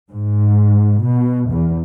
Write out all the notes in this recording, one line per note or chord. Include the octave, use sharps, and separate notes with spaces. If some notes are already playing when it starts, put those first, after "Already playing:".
G#2
B2
E2